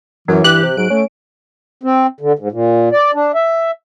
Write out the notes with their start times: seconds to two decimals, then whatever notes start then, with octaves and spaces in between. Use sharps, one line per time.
0.28 F#2 E3 F#3
0.44 G2 G4 F#6
0.62 C3
0.77 G#2 F#3 D7
0.90 A3 C#4
1.83 C4
2.20 D3
2.39 G#2
2.52 A#2
2.92 D5
3.14 D4
3.35 E5